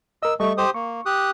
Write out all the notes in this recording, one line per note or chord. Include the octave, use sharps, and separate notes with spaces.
A#4 D#5 E6
G3 A3 A4 D#5 C#6
G4 C5 D#6
A#3 C#6
G4 D#6 F#6